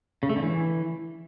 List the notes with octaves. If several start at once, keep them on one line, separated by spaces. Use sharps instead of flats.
C#3
A3
D3
E3